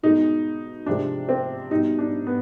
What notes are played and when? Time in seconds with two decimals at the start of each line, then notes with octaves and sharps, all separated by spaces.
0.03 B2 G#3 D#4
0.86 C3 F3 G#3 D4
1.29 C4
1.70 B2 G3 D#4
1.99 D4
2.27 B3